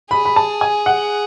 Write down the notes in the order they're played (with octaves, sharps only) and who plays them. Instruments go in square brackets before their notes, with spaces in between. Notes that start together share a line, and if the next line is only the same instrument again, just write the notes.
[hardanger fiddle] G#4 [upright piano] B5
[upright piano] B5
A5
G#5
F#5